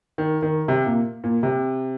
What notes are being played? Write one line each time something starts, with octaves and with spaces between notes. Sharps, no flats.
D#3
D#3
C3
A#2
A#2
C3